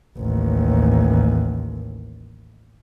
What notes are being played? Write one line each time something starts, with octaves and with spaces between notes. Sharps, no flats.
A1 D#2